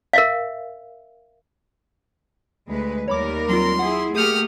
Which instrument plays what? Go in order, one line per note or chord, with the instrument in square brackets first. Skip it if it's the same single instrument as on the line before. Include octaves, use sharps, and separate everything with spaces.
[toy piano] A#4 E5 F5
[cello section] D2 G#3 B4
[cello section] D#2 G3 A#4 [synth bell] C#5 B5 D6
[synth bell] F#3 C4 F4 [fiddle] C6
[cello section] E4 G#4 [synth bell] F#5
[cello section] A3 A#3 G4 [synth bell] G#4 G6 C#7 [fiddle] D#6 F6